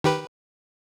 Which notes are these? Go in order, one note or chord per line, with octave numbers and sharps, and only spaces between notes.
D#3 G4 B4